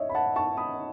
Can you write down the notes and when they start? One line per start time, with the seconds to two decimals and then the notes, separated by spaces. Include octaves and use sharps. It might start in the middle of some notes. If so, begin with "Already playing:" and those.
Already playing: C#5 D#5 E5
0.09 B5
0.15 F#5 A5
0.36 A5 C#6
0.57 B5 D#6